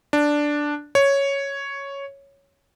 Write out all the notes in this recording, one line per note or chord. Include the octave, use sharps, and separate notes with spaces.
D4
C#5